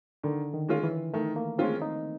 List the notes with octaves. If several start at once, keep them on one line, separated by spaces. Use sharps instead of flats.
D3 D#3
D#3
G#3 C#4 F4
E3
D#3 A3
A#3
G#3 C4 C#4 F4
D#4